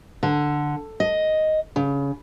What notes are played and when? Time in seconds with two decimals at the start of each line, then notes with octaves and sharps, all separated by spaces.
0.23 D3
1.00 D#5
1.76 C#3